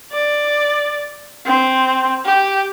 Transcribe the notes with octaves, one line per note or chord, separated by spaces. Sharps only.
D5
C4
G4